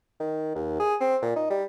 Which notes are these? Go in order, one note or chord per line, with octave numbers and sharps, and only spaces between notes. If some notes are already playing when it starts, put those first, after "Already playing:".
D#3
D#2
G#4
C4
A#2
D#4
G3